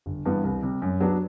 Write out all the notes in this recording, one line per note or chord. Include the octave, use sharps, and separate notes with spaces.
G1
G2 E3 B3
C2
C3 G3
F#2
F#3 B3 D4